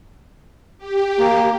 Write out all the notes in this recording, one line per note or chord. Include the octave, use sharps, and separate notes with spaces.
G4
A#3